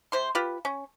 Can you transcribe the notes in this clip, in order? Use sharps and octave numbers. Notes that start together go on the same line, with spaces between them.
C3 C5 C6
F4 G4 B4
C#4